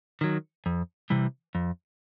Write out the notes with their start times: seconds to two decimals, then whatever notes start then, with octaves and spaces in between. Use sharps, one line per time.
0.21 D#3 F#3
0.66 F2
1.10 C3 E3 G3
1.55 F2